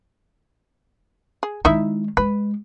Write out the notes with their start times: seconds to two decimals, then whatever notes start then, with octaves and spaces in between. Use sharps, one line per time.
1.43 G#4
1.65 D#3 G#3 D#4 E4 E5
2.17 G#3 B4